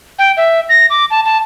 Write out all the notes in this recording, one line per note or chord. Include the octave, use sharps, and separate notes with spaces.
G5
E5
A#6
D6
A5
A5